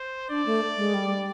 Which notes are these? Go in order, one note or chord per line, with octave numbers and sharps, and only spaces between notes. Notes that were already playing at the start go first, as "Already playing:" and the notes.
Already playing: C5
D4 D5
A3
G#3
G3